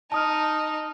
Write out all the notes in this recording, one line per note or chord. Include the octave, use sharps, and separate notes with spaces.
D#4 A5 D#6 F6